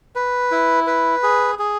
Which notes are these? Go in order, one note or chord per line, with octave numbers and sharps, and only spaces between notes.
B4
E4
B4
G#4
G#4